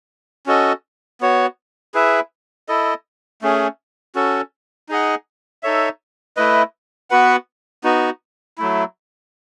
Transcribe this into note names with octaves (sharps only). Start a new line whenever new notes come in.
C#4 F#4 A4 D#5
B3 F#4 C#5
E4 G#4 B4 E5
E4 A4 D#5
A3 C#4 G#4
C#4 F#4 A4
D#4 G#4 D#5 F#5
D#4 A4 C#5 E5
A3 E4 B4 D#5
B3 F#4 B4 F#5
B3 D#4 F#4
F#3 A3 E4